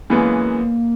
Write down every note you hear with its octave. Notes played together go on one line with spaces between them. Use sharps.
F#2 E3 G#3 A#3 B3